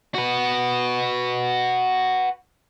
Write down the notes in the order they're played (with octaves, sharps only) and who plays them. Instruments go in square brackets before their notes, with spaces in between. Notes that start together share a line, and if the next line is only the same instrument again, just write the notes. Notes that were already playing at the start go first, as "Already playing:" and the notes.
[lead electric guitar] F#4 B4